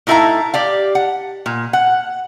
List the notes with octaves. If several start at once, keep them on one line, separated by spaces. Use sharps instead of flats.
A2 D#4 E4 A4 F5 A#5
G4 D5 F5
F#5
A#2
F#5